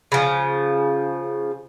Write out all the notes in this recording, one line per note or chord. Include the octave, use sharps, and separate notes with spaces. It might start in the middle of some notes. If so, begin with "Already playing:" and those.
C#3 F3